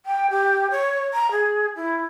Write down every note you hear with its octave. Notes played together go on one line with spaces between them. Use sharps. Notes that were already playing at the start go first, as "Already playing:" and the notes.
G5
G4
C#5
A#5
G#4
E4